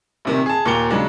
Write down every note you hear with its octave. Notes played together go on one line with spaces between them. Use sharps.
A#1 C3 D#3
G#4 A5
D#2 A#2 A#4 A#5 C#7 G7
C#3 F#3 G#3 D4